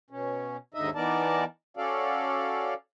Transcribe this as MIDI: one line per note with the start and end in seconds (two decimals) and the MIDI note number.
0.11 0.57 47
0.11 0.57 61
0.74 0.90 39
0.74 0.90 44
0.74 0.90 50
0.74 0.90 63
0.74 0.90 75
0.74 0.90 76
0.95 1.44 52
0.95 1.44 59
0.95 1.44 63
0.95 1.44 70
0.95 1.44 74
0.95 1.44 81
1.77 2.74 61
1.77 2.74 66
1.77 2.74 69
1.77 2.74 74
1.77 2.74 77